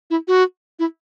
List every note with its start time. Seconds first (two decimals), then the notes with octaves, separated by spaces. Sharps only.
0.10 E4
0.28 F#4
0.79 E4